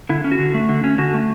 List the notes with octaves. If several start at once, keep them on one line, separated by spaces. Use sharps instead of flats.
D3 E4
C#4
F#4
D3
A3
D3
C#4
D3 F#4
A3